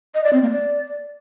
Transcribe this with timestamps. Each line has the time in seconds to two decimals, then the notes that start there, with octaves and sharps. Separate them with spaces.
0.14 D#5
0.24 D5
0.33 C4
0.42 A#3
0.51 D5